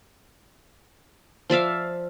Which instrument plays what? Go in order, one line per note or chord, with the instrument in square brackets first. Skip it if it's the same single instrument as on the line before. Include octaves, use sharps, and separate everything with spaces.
[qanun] F3 D5 E5 F5